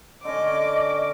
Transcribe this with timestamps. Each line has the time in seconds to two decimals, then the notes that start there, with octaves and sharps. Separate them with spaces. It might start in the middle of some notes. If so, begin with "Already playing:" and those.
0.25 D3 C#4 D#5 D6